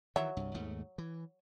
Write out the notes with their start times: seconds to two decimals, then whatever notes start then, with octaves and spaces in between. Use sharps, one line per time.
0.16 D#3 E3 F#3 E5
0.37 C2 G2
0.54 D#2 G#2 A3
0.98 E3